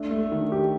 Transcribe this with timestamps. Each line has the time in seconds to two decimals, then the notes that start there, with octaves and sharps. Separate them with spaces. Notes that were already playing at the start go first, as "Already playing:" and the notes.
Already playing: A3 D4
0.11 A3
0.32 D#3
0.52 G4